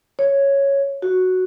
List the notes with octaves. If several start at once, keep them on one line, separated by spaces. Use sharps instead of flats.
C#5
F#4